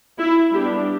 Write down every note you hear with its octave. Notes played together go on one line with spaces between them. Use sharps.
E4
G3 B3 D4 G4